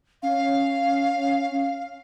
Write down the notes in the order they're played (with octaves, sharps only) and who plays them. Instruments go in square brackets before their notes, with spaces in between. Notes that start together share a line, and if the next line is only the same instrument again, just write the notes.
[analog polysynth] C#4 [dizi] F5